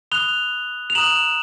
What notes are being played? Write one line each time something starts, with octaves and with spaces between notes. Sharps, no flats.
B5 D#6 F#6 F7 G7
F7
A#5 D#6 F#6 E7 F#7